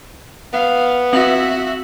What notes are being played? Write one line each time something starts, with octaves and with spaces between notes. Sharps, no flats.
B3 F5
C4 F#4 E5 F#7